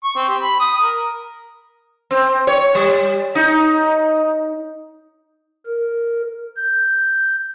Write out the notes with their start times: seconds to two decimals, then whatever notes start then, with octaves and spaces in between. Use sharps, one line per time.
0.04 C#6
0.16 C4
0.28 G4
0.42 B5
0.60 D#6
0.81 A#4
2.11 C4
2.47 C#5
2.75 G3
3.35 D#4
5.66 A#4
6.56 G6